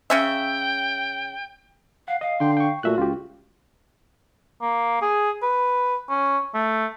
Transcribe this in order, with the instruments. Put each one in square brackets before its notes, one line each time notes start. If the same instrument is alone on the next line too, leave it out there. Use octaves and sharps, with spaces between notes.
[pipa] C#3 C#4 E5 [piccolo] G5
[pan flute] F5 [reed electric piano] F#5
[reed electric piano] D#5 [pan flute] F5
[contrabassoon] D3 [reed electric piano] G5 C6
[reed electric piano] G5 C#6
[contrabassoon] A#2 [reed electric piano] A3 E5 F#6 [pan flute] F#4
[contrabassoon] C#2 [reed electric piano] F4 G4
[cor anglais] A#3
G#4
B4
C#4
A3